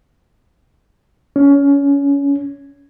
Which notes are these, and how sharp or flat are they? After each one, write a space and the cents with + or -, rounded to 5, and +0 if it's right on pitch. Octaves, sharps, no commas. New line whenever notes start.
C#4 +25